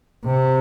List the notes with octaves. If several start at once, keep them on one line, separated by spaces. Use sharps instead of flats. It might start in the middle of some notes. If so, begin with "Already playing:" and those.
C3